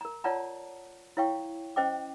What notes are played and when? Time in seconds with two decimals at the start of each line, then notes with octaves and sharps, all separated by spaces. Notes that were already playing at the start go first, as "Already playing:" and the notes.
0.01 A#4 A#5
0.24 F4 C#5 D5 F#5 A5 A#5
1.17 E4 C#5 F5 G5 C#6
1.76 C#4 C5 D#5 G5 D6